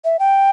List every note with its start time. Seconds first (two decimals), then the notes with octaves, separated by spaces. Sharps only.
0.05 E5
0.19 G5